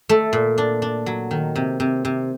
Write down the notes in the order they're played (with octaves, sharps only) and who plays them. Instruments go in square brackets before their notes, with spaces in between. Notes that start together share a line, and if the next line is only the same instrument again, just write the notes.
[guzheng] A3
A#2
D4
D4
F#3
D#3
C3
C3
C3